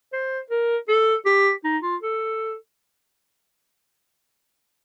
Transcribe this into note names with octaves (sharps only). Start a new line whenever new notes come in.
C5
A#4
A4
G4
D#4
F4
A4